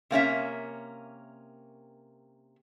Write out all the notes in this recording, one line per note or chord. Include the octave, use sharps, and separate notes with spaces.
C3 A#3 C#4 E5